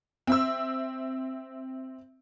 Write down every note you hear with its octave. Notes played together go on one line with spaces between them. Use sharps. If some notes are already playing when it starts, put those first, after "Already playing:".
C4 E5 E6